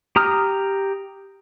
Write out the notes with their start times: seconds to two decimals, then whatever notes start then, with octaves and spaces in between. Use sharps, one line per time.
0.16 G4 A#5 D#6 F6